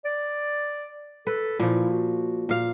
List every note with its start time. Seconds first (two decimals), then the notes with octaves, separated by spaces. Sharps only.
0.05 D5
1.27 A4 B4
1.60 A#2 F3 E4
1.90 F#4
2.49 A#2 F5